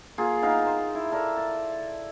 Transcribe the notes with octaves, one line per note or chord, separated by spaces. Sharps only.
A#3 F4 G#4
B3 D#4 A#4 F5
C5
E4
A4 A#4 D5
A5